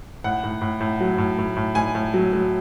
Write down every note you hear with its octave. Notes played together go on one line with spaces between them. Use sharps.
A2 F#5
A2
A2
A2
F#3
A2
A2
A2
A2 G#5
A2
F#3
F#3